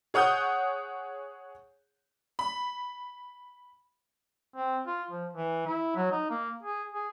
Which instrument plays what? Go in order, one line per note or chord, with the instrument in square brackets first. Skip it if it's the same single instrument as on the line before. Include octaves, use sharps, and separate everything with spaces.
[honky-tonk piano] G#4 C#5 F#5 D#6 G6
B5
[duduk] C4
F4
F3
E3
E4
F#3
D#4
A#3
G#4
G#4